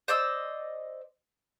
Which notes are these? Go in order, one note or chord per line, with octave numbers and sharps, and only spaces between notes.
C5 D5 D#5 E6